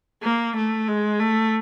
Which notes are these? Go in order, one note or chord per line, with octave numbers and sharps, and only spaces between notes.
A#3
A3
G#3
A3